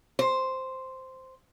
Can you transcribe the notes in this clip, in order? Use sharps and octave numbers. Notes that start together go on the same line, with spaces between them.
C5